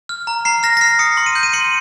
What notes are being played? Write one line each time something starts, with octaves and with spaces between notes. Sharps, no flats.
F6
A#5
A#5 C7
F6 A#6
A#6
F6 C7
D#6 C#7
C6
D#7
G6
D#7
C6 C#7